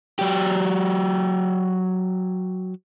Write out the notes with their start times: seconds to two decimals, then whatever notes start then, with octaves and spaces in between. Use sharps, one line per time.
0.19 F#3 G4